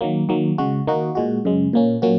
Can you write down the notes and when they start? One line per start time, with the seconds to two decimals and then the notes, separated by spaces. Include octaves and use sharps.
0.01 D#3 F#3 A#3
0.29 D#3 F#3 A#3
0.58 C#3 G#3 F#4
0.87 D#3 A#3 D#4 F#4
1.15 A#2 G#3 F#4
1.45 F#2 C#3 G#3
1.73 A#2 A#3 C#4
2.02 A#2 F#3 A#3 C#4 F#4